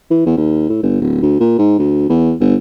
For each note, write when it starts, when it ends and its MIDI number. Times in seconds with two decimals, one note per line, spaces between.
0.11 0.25 52
0.26 0.37 40
0.37 0.69 39
0.69 0.81 45
0.83 0.99 31
1.01 1.21 26
1.22 1.39 38
1.40 1.57 46
1.59 1.77 44
1.79 2.05 38
2.09 2.33 40
2.41 2.55 31